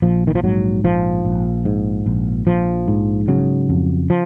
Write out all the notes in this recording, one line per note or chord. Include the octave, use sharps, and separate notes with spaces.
A#1 F3
D#3
F3
G#2 F#3
A#1 F3
A#1
G#2
A#1
A#1 F3
G#2
C#3 F#3
F2
F3